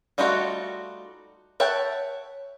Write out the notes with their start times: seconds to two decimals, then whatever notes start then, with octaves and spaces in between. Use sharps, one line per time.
0.18 G3 A3 D#4 F4 F#4
1.60 C#5 E5 F#5 G5 A5